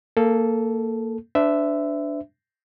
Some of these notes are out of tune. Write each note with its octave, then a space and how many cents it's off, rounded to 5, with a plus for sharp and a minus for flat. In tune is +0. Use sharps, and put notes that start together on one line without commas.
A#3 -20 A4 -5
D4 +0 C5 -45 E5 +0